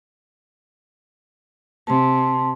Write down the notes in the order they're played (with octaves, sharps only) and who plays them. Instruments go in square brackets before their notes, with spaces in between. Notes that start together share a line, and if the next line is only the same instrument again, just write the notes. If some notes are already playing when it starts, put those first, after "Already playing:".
[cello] C3 [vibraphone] A5 C6